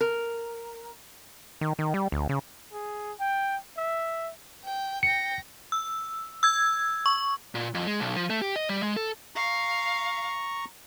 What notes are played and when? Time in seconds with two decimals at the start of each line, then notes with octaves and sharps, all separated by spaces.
0.01 A#4
1.61 D#3
1.79 D#3
1.94 G3
2.12 D2
2.29 C#3
2.73 G#4
3.20 G5
3.77 E5
4.64 G5
5.03 G5 A#6 C#7
5.72 E6
6.43 E6 G#6
7.06 C#6
7.55 A#2
7.74 F2
7.87 G#3
8.00 B1
8.16 F3
8.30 A3
8.42 G4
8.56 D#5
8.69 G3
8.83 G#3
8.96 A4
9.36 F5 A#5 C#6